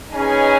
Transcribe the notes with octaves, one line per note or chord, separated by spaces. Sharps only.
C#4 D#4 G#4 B4 D#5 G#5